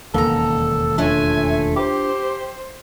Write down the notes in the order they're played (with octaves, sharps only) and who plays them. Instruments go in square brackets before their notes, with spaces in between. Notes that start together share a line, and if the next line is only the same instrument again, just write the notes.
[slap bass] E1 D#2 C#3 [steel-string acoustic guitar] A#3 A#5 [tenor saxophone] A4
[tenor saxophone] A3 [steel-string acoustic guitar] D4 F4 C#5 [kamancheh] E5 G#5
[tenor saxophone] G4 [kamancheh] C5